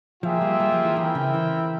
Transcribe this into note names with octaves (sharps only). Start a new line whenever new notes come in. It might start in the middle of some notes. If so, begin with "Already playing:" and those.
F3 A#3 F4 G#4 E5 G5
G3
G3
F3
E3
E3 C4 E4 A#4 E5 G5
C#3
E3